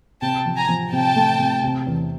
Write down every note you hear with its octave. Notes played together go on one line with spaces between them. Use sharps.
C3 G5 A5
F3
G#5 A#5
F3
C3 G5 A5
A3
C3
C3
E2